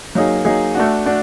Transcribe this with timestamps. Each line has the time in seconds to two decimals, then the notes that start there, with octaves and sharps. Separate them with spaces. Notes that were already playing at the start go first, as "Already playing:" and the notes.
0.15 F#3 A#3 D#4 G#4
0.45 F#3 A#3 D#4 G#4
0.75 A3 D4 F#4
1.06 A3 D4 F#4